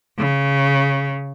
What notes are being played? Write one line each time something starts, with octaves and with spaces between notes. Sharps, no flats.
C#3